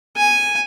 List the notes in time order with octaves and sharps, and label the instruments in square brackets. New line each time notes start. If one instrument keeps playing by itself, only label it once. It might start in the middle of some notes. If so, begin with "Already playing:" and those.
[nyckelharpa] G#5